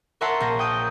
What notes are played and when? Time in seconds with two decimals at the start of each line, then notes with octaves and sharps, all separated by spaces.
0.21 A#4 C#5 E5 F#5 A5 C6
0.40 A#1 A#6
0.59 G5 D#6 G6